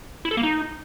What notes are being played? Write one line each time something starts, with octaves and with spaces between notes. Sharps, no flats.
E4
A4
A#3
D#4